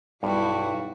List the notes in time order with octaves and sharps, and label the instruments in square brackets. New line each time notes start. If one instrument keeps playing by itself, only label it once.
[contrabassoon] B1 [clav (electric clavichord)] G2 [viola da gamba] G3 E4 F#4